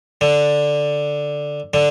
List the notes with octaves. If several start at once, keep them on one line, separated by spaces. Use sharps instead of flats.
D3
D3